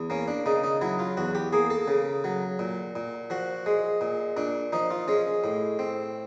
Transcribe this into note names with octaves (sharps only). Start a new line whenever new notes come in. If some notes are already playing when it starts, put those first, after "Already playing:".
Already playing: E2
A#3 C#4
D4
C#3 D#4
D#4
F#3 E4
F4
E2 F#4
G4
A#3 G#4
A4
C#3
F#3
A#2
A#2
F3 F#4
G#3
A#2
A#2 D4
F3 D#4
F4
G#3 C#4
A2
C4